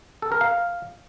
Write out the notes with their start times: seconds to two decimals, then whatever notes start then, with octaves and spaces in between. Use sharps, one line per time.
0.22 A4
0.32 A#4
0.41 F5